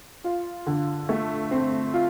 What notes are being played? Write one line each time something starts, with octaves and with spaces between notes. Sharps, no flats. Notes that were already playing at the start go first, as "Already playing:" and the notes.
F4
D3
A3
C4
F4